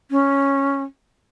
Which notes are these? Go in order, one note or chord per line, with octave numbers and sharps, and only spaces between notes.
C#4